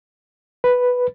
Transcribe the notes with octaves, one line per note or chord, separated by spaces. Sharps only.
B4